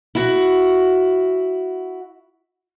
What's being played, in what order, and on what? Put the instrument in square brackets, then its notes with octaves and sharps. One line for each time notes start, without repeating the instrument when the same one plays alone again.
[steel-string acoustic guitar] E4 F#4